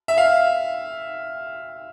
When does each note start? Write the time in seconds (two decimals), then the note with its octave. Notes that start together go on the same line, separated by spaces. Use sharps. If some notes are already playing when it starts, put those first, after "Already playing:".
0.08 E5
0.18 F5